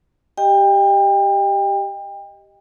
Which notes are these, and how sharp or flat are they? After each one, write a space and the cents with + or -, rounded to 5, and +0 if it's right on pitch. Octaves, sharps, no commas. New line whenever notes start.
G4 +0 D#5 +0 G5 +30